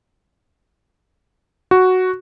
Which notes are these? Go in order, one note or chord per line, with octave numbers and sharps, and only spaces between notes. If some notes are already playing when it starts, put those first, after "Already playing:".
F#4